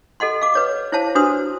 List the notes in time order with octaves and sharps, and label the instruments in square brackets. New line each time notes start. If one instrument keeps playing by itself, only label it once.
[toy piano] A4 D#5 F#5 C6
F5 D6
B4 C#5 D6
E4 C5 C#5 F5 A5
D4 F#4 B4 C5 C6 D#6